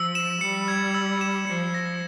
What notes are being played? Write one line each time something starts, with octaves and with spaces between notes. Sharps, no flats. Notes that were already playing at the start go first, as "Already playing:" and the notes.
Already playing: F3 E6
E7
G3 C#7
G#6
E6
E7
F3 C#7
A#6